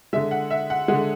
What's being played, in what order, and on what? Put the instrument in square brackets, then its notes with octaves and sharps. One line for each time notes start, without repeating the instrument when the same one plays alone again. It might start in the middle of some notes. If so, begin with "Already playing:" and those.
[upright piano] D3 G#3 E5
F#5
E5
F#5
D3 G#3 F#5